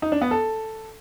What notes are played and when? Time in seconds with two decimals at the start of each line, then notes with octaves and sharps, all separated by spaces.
0.02 D#4
0.12 D4
0.22 B3
0.31 A4